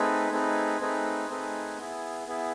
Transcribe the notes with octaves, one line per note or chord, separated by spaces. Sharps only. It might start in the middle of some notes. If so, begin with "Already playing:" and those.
Already playing: A3 C4 D#4 G#4 B4
A3 C4 D#4 G#4 B4
A3 C4 D#4 G#4 B4
A3 C4 D#4 G#4 B4
B3 E4 G#4
B3 E4 G#4